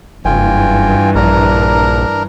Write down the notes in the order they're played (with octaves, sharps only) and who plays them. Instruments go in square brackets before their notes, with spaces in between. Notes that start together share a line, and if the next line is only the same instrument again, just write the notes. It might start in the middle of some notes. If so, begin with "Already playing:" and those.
[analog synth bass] F#1 [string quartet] G2 E3 [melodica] F4 G5 G#5
[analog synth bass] A#1 [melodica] D4 A#4 A#5